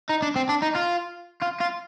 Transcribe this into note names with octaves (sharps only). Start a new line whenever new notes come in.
D#4
D4
C4
D4
D#4
F4
F4
F4